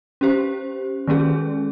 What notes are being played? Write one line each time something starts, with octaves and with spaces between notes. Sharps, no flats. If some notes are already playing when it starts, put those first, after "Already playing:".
C#4 G4 C5
D#3 G#3 C#4 G#4